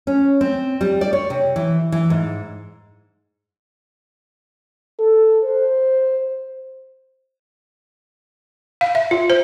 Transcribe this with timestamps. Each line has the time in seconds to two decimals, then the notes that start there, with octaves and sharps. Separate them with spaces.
0.07 C#4
0.41 C4
0.81 G3
1.01 D5
1.13 C#5
1.30 C3
1.56 E3
1.92 E3
2.10 G#2
5.00 A4
5.44 C5
8.81 F5
8.95 E5
9.11 F4
9.30 C5